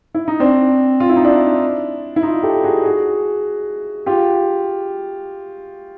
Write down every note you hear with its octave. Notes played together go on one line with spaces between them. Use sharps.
E4
D#4
C4 D4
F4
E4
D#4
D4 E4
E4
D#4 F4
G4 A4
F#4 G#4
F#4 G#4
F4 G4